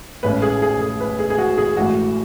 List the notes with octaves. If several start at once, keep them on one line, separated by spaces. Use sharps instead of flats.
A1 A2 G#3 C#4 B4
G#4
G#4
G#4
B4
G#4
G#4
F#4
G#4
A1 A2 E3 G#3 F#4